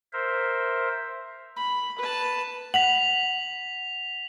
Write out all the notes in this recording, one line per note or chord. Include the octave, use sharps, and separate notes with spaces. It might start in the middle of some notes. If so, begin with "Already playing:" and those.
A#4 C5 E5
B5
B4 A5
F#5 B6 F7 F#7